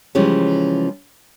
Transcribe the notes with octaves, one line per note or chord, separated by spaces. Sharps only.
C#3 E3 F3 G3 G#3 C#4